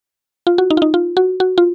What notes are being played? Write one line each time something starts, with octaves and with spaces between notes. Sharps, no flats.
F4
F#4
D#4
F4
D#4
F4
F#4
F#4
F4